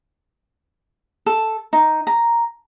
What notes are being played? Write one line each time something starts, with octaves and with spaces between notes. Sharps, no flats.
A4
D#4
A#5